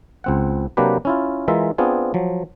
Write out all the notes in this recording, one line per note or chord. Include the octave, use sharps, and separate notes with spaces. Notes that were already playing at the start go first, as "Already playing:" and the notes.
C#2 C4 F#5
C3 F#3 A#3 D4 G4 B4
C#4 E4 F4
E3 G#3 F4 A#4 E5
B3 C4 D4 F4 G#4
F3 F#3